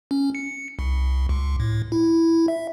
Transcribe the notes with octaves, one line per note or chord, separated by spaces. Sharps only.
C#4
C#7
C2
C#2
A2
E4
E5